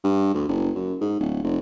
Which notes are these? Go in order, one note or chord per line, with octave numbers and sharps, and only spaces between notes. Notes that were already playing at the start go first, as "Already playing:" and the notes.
G2
D2
F#1
F#2
G#2
D1
F1